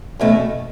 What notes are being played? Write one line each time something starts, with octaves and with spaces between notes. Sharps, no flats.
E2 B2 A3 C#4